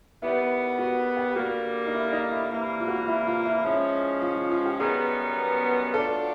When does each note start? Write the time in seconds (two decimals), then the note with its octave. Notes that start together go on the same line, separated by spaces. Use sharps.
0.22 D#3 G3 B3 E4
0.79 F#4
1.17 G4
1.36 D3 G3 A#3 F#4
1.87 D#4
1.94 E4
2.13 D#4
2.31 E4
2.51 C3 E3 G3 A#3 E4
2.80 F4
2.88 F#4
2.96 F4
3.08 E4
3.27 F4
3.46 E4
3.65 G#2 F3 G#3 C#4 E4
4.22 F4
4.36 F4
4.52 F4
4.66 G4
4.79 F#2 D#3 G3 B3 G#4
5.94 F#3 A3 D4 F4 A4